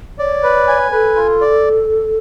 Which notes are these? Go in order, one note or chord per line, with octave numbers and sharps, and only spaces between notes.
C#5 D5
B4
G#5
A4 B4
F4
D5